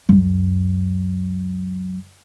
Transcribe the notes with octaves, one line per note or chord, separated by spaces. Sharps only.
C#2 F#2